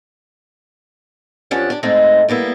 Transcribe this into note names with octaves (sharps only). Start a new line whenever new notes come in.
F#2 F3 C#4 D4 G4 F#5
D4 G4
G#2 G#3 A3 C4 D#4
G3 A#3 B3 E4